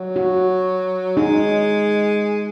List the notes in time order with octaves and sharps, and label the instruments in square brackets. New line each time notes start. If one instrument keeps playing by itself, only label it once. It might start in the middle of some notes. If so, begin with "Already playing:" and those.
Already playing: [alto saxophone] F#3
[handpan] F#4
[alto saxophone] G#3 [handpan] D#4